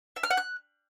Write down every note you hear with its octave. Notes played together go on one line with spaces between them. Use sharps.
E5
F6
F#5
F#6